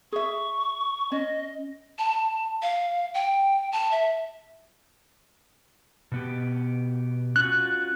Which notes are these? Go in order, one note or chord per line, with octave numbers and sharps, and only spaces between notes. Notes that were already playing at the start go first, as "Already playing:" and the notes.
G#4 E5 C#6
C#4 D#5
A5
F5
G5
A5
E5
B2 B3 G4
C#4 F4 F#4 F#6